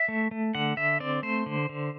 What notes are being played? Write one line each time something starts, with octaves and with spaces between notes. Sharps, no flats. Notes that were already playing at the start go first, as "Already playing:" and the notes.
Already playing: E5
A3
A3
D3 F#5
D3 E5
C4 D5
A3 C5
D3
D3